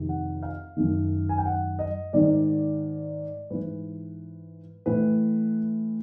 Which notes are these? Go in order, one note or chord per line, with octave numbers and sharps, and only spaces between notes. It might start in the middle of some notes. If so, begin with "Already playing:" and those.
Already playing: F2 C3 D#3
F#5
F5
F#2 D#3
G#5
G5
F#5
D#5
G#2 D#3 D5
G#2 E3 B4
A2 E3 B4